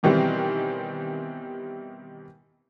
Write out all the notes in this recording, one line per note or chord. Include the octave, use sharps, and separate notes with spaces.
B2 D#3 E3 G3 C4